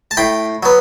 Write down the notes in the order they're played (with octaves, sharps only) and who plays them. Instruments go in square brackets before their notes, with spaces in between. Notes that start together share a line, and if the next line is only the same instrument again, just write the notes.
[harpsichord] A5
A2 G5 B5
F#3 B3